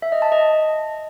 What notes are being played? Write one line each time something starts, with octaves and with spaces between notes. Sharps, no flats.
E5
D#5
A5
D#5